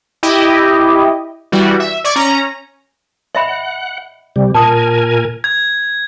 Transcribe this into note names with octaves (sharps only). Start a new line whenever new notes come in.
E4 G4 D#5
E3 G3 F#4
E5
D5 C#6 D6 G#6
C#4 A#5
D#5 E5 F#5 B5
C3 G3
A#2 A#4 G#5 A5 D#6
G#6